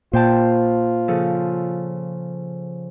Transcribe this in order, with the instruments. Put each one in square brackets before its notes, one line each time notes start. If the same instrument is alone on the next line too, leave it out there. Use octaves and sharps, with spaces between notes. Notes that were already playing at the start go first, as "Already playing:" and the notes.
[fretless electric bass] A#2 [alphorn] F4 [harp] C5 G5 A5
[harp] C#3 F3 A4